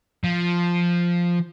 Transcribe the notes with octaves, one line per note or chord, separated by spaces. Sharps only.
F3